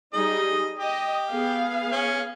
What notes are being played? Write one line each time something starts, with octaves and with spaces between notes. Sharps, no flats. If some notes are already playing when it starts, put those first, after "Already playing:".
G3 D#4 G#4 D#5
G4 D#5
B3 G#4 F5
C#4